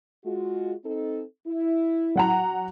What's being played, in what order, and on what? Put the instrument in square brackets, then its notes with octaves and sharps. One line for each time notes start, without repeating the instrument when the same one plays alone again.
[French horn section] G#3 F4 F#4
C4 D#4 A4
E4
[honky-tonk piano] F#3 F#5 A#5